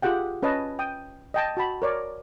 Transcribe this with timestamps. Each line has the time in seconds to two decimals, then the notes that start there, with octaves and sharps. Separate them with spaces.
0.02 F4 G4 G#4 F#5 G5
0.43 C#4 B4 C#5 D#5 A5
0.79 G5 D#6
1.34 D#5 G5 A5
1.57 F#4 A5 B5
1.82 A#4 C#5 D5